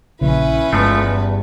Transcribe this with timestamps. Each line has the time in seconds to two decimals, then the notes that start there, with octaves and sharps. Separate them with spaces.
0.21 A#1 C#3 C#4 E4 B4
0.73 G1 E2 F3 G#3 A3
1.02 G2